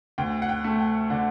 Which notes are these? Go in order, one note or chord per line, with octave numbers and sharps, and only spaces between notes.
D2 G5
F#5
G5
A3
G5
D3 F#5